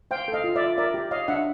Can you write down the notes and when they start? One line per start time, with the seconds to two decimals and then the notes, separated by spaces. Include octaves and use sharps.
0.11 C5 F5 G5
0.28 A4
0.34 D#5 F5
0.44 F4
0.56 D5 E5
0.61 F4
0.78 A#4 D5 E5
0.94 G4
1.11 C#5 D#5 F5
1.28 D4 E5 F#5